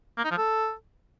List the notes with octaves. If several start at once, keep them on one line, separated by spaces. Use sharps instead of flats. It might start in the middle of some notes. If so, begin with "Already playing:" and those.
A#3
D#4
F3
A4